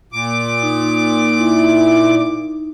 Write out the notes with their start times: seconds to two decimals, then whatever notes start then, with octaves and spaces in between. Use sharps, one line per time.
0.12 A#2 D6
0.62 D#4
1.38 E4